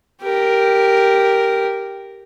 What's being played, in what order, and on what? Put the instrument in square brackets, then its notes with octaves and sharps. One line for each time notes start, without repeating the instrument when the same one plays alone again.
[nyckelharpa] G4 A#4